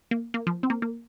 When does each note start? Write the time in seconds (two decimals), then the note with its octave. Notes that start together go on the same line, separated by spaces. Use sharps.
0.11 A#3
0.34 A#3
0.47 F3
0.63 C4
0.70 A#3
0.82 A#3